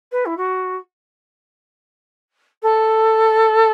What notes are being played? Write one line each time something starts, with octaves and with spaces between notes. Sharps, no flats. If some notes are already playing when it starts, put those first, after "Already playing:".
B4
E4
F#4
A4